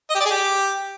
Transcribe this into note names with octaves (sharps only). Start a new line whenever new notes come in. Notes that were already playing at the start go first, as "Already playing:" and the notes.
D#5
G4
D5
G#4
G4